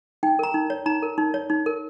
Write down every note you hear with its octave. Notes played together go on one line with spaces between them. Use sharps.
D#4 G5
A#4 A#5
D#4
C#5
D#4 A#5
A#4
D#4
C#5
D#4
A#4